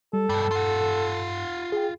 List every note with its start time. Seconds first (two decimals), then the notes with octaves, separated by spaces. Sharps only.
0.13 G3 A4
0.30 G2 B2 G3
0.51 F4 F#5
1.72 G#4 G5